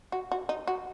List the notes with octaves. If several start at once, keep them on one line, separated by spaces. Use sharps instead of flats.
F#4
F#4
D#4
F#4